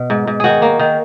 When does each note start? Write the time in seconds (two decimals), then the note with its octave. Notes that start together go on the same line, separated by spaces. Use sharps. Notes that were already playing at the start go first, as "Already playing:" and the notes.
Already playing: B2
0.10 G#2
0.27 G#2
0.40 D#3 F#4 G#4
0.62 A#3
0.79 D#3